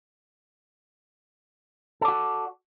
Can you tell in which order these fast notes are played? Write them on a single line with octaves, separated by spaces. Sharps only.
A4 D5 F#4